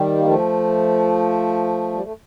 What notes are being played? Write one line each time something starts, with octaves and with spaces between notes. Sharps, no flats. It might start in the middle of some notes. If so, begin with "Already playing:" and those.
Already playing: D#3 G3
A#3
F3 A3
G3
A3